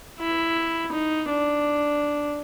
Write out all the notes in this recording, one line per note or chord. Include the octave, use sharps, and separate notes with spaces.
E4
D#4
D4